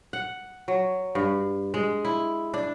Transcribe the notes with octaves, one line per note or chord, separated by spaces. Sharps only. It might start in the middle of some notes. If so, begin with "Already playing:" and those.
F#5
F#3
G2
G#3
E4
D4